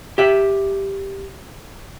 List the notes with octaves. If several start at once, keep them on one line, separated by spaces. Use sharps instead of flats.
G4 E5